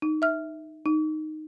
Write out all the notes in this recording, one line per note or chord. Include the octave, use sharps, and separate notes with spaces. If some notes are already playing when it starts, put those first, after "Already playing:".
D#4
E5 F6
D#4